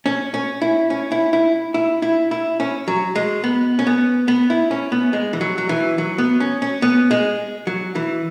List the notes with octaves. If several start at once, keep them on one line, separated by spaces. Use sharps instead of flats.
C#4
C#4
E4
C#4
E4
E4
E4
E4
E4
C#4
F#3
G#3
B3
C#4
B3
B3
E4
C#4
B3
G#3
E3
F#3
F#3
E3
F#3
B3
C#4
C#4
B3
G#3
F#3
E3